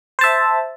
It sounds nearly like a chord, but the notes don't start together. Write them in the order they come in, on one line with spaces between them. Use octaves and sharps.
C5 A5 E5